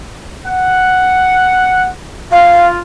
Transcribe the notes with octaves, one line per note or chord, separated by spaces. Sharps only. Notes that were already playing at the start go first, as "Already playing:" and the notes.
F#5
F4 F5